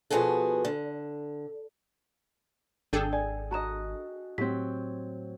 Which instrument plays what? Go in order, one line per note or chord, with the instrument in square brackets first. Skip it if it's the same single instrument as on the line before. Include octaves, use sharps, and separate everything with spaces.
[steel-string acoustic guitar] B2 F3 B3 F#4 G#4 A4
D3
[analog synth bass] G#1 [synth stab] D4 G#4 A4 [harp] G5
[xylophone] D5 [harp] G#5
[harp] F#4 D#5 [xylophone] A5 A#5 E7
[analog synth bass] A2 [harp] F#3 C4 [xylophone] G4 B6